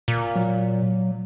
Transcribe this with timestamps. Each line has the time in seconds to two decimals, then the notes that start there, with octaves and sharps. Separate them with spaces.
0.08 A#2
0.36 F#3